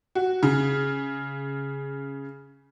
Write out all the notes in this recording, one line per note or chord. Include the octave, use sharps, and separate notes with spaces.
F#4
C#3